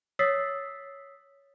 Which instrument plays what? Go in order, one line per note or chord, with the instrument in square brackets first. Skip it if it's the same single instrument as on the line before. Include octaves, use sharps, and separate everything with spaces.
[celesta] C#5 D#6 E6 A6 B6 C7